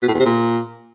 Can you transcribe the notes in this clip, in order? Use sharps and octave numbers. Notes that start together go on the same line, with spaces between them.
B2
A2
E2
C3
A#2